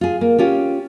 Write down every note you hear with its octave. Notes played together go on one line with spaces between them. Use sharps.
F4 G#4
A#3
C#4 F4 G4